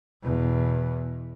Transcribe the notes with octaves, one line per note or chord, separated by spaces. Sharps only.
E2 B2